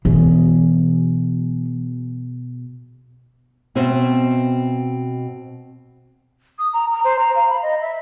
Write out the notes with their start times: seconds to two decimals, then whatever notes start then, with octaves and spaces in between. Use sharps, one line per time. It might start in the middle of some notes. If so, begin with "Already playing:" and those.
0.05 B2 E3 G#4
3.75 B2 C4 E5
6.59 D#6
6.73 A#5
6.93 A#5
7.04 C5
7.19 A#5
7.36 F5
7.50 B5
7.62 D#5
7.81 E5